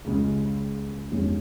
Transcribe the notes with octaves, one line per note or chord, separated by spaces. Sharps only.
C#2 C#3 G#3
G1 F2 D#3 G#3 C#4